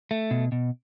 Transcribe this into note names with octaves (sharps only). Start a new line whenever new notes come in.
A3
B2
B2